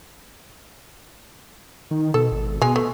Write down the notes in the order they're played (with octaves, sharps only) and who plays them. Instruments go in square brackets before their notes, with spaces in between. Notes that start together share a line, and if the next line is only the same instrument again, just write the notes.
[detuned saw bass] D#3
[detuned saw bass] B2 [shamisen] A4
[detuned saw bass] G#1
[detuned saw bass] B2 [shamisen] G#3 G#5
[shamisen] A3